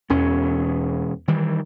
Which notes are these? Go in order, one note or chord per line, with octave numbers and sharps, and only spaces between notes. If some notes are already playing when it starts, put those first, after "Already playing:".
E1 E2 C#4
D#3 E3 G3